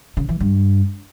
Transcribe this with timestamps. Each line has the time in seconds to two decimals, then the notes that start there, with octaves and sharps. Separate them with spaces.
0.17 C#3
0.29 E3
0.40 G2